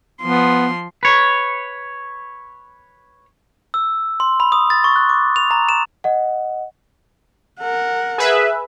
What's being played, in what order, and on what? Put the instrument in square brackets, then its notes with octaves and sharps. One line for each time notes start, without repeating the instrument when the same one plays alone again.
[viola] F3 C6 [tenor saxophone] B3
[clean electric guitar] B4 C#5
[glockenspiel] E6
C6
B5
D#6
A6
C#6
F#6
D6
F7
A#5
E7
[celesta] D#5 F#5
[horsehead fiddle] A#4 F#5
[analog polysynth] G#4 B4 E5